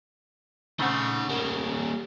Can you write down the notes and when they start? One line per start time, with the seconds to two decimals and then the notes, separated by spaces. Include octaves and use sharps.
0.79 C#3 A3 C4 D#4 F#5
1.29 G3 A#3